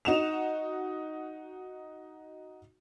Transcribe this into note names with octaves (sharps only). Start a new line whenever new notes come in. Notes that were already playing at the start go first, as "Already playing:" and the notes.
D#4 F#4 E7 F7